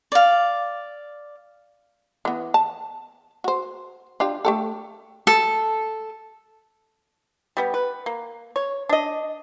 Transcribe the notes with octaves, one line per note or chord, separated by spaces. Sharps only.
D5 F5
E3 B3
A5
F#4 C5
D4 F4 G4
A3 G4 A4
A4
G3 B3 G4
B4
A#3
C#5
D4 D#5